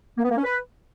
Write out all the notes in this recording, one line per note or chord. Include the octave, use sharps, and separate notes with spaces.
A#3
B3
A#3
C#4
B4